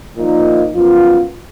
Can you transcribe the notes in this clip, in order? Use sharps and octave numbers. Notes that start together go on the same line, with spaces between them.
A#2 F3 A#3 D#4
F#2 F3 B3 F4